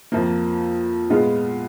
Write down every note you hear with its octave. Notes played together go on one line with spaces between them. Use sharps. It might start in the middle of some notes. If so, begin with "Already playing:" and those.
F2 F3 A#3
A#2 G#3 B3 F4